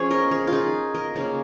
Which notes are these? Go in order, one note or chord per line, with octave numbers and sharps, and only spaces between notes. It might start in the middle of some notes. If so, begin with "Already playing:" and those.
Already playing: F3 C#4 G#4 C#5
A#4 D#5
G#4 C#5
F4
D#4 G#4
A#4 D#5
C#3 A#3 C#4 G#4 C#5